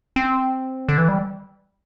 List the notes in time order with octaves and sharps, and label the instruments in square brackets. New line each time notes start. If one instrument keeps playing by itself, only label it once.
[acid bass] C4
D3
E3
G3